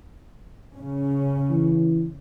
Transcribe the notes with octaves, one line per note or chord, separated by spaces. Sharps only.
C#3 C#4
E3